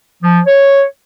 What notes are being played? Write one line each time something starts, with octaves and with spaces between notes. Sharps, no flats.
F3
C#5